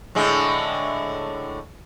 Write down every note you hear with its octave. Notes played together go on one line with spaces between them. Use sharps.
A2 D3 G#3